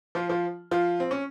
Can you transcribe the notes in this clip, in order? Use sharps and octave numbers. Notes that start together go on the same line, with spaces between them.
F3 F4
F3 F4
F3 F4
C4
C#4